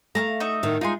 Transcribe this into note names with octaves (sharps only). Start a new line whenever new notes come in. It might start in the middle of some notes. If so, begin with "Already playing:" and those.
A3 F5 A5 A#5
D#4 F#4 E5
A2 D#3
G#3 D#4 F4 G#5 C6